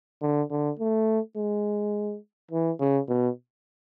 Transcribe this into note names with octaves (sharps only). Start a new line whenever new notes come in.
D3
D3
A3
G#3
E3
C#3
B2